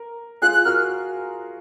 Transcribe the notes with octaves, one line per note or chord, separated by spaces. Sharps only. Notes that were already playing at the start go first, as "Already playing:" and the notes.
Already playing: A#4
F4 G#4 F#6
F#6
F#4 A#4 F6